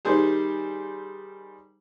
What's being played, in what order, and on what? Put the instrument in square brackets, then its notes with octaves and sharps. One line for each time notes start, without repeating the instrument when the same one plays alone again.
[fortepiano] D#3 G3 G#4 C5